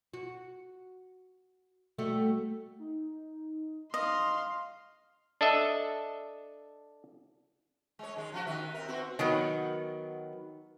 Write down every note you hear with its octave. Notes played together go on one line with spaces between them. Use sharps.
F#4
G3 A3 F#4
D#4
D#5 F5 C6
D4 A4 D#5 E5
G#3 C#5
D#3 G#3
F3 F4 F#4
D#2 D#3 E5
C4 A#4
B3 C4 F#4
D#3 F#3 B3